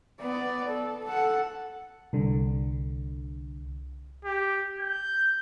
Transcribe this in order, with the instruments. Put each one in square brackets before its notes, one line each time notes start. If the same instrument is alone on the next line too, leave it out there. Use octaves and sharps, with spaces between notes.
[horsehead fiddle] B3 D5
A4
A4 F#5
[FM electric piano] C2 D3
[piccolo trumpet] G4
G6